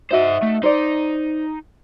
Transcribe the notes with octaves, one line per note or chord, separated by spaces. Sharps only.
D#4 F#4 C5 D#5 E5
A3
D#4 C5 D5